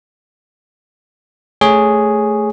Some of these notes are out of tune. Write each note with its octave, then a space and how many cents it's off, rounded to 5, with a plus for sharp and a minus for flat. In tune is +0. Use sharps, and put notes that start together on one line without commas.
A3 +0 G#4 +0 C#5 +0